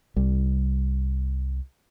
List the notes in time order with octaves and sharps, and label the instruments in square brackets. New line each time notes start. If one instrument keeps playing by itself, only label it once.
[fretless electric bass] C2 G3